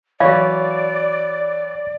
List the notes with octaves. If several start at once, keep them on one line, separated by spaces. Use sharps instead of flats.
E3 F#3 C#5 D5 F5 B5 G#6